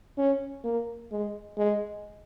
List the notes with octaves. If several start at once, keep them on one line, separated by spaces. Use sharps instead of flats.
C#4
A#3
G#3
G#3